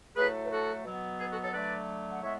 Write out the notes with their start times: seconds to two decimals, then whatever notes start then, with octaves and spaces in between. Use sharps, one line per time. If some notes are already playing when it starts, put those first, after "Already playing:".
0.16 A2 F#3 A3 G#4 B4
0.44 B4
0.50 F#4 A4
0.85 B2 F#3 B3
1.19 G#4 B4
1.31 F#4 A4
1.42 A4 C#5
1.53 D3 F#3 A3 B4 D5
2.10 F#5
2.22 A2 G#3 B3 C#5 E5